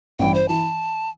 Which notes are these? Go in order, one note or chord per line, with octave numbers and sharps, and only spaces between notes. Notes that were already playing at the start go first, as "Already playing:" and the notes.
A1 G2 E3 G5
C5
E3 A5